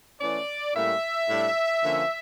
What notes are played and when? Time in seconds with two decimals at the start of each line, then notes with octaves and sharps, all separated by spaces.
0.20 E3 A3 C#4 D5
0.75 A2 G3 A#3 C#4 E5
1.29 A2 G3 D4
1.83 D3 F3 A#3 C#4